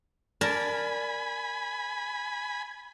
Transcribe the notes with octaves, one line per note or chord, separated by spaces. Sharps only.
A#4 D5 G#5 A5 B5